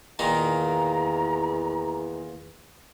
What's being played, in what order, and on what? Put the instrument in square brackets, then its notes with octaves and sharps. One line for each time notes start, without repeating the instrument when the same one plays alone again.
[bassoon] E2 [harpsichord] A#2 D#3 A#3 [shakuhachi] A#5